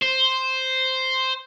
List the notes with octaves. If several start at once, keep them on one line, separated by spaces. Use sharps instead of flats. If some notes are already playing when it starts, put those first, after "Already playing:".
C5